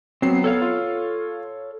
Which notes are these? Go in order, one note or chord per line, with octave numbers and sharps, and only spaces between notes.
F#3 B3 C4 C7
B3 A4 C#5 F5
F4